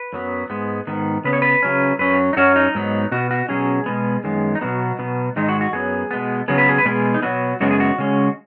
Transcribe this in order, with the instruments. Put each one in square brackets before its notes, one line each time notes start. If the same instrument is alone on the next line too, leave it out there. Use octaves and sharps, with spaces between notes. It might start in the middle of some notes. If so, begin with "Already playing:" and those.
Already playing: [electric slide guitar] B4
F#2 F#3 B3
G#2 G#3 B3
G#2 D#3 B3
C#3 B3 B4
C#5
B4
C#3 F#3 C#4
F#2 F#3 C#4 B4
D#4
F#2 F#3 C#4 F#4
D#4
G#2 F#3 B3
B2 B3 F#4
F#4
B2 F#3 C#4 G#4
B2 G#3 B3
F#2 D#3 G#3 B3
D#4
B2 F#3 B3 F#4
B2 F#3 B3
G#2 D#3 G#3 D#4
F#4
F#4
F#2 F#3 B3 G#4
B2 G#3 B3
C#3 F#3 B3 G#4
B4
G#4
B4
B2 G#3 B3 G#4
D#4
B2 F#3 B3 F#4
F#2 C#3 G#3 B3 F#4
G#4
F#4
C#3 G#3 C#4